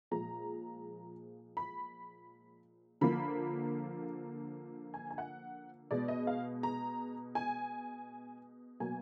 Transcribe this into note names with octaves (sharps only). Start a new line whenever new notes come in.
A#2 F3 G#3 A#5
B5
D3 F3 A#3 B5
G#5
G#5
F#5
B2 G#3 D5
D#5
F5
A#5
G#5
B2 F#3 A#3 G#5